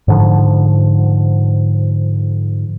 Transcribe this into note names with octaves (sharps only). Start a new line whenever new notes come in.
G#2 D3 F3